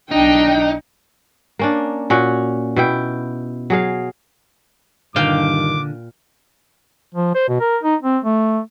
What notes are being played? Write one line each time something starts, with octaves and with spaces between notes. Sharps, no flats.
B1 D4 D#4 G5
A#3 C#4 D4
A#2 C#4 F#4 F#5
B2 E4 G5
F#3 G#4 F5
G2 A#2 D3 D#3 F5 G5 D6
F3
C5
B2
A#4
D#4
C4
A3